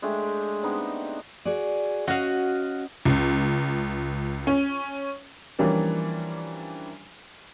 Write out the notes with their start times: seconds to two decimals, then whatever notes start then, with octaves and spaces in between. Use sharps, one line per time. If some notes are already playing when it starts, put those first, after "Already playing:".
0.02 G#3 A3 D4 G4
0.63 B3 C4 D4 D#4
1.45 F#4 G#4 D5
2.08 C#4 F#4 D#5 F5
3.05 C#2
4.47 C#4
5.59 E3 F3 G3 A#3 C#4 D4